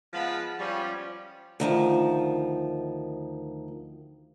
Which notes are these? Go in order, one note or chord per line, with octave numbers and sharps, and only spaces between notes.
F3 G#3 B3 F5 A5 B5
F3 G3 C#4
D2 D#3 F3